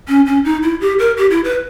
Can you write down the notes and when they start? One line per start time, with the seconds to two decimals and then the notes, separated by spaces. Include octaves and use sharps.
0.08 C#4
0.26 C#4
0.45 D#4
0.63 E4
0.81 G4
0.99 A#4
1.17 G4
1.30 E4
1.44 B4